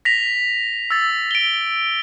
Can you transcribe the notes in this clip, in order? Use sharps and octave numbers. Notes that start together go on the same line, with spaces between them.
A#6 B6 F7
E6 A6
D7 G7